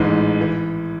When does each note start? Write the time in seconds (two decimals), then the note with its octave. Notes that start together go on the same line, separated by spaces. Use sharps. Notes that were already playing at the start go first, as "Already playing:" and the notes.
Already playing: A1 G#2 E3 G#3
0.41 E3